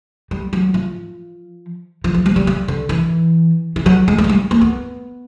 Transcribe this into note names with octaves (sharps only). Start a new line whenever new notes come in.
G3
F#3
F3
F3
F3
G3
G3
G3
D3
E3
E3
F#3
G#3
G3
F#3
G3
A#3
B3